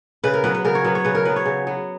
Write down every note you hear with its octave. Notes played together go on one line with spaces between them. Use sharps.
C#3 B4
A#4
F#3 B3 B4
B4
C#3 A#4
C#5
F#3 B3 B4
C#5
C#3 B4
A#4
F#3 B3 B4
C#5
C#3
F#3 B3